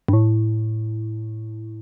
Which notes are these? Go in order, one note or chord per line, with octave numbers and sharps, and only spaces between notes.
G2
A2